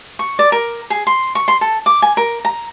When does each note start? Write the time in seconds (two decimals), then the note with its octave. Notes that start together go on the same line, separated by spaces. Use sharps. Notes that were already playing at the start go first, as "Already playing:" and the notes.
0.19 C#6
0.39 D5
0.52 A#4
0.90 G#4
1.07 C6
1.35 C#6
1.48 C6
1.61 A4
1.86 D6
2.02 G#5
2.17 A#4
2.45 A#5